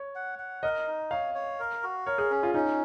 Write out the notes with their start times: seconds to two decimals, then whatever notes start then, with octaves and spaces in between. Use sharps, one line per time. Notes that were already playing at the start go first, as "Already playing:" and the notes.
Already playing: C#5
0.15 F#5
0.39 F#5
0.63 A#4 D#5
0.87 D#4
1.11 C#5 F5
1.35 C#5
1.59 A#4
1.83 F#4
2.06 A#4 C#5
2.18 G#4
2.31 C#4
2.43 F4
2.54 C#4 D#4